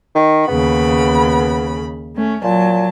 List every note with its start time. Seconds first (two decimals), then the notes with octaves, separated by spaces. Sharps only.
0.15 D#3
0.48 D#2 C#3 B3 B5
2.15 A3 C#4
2.44 A#2 F#3 A5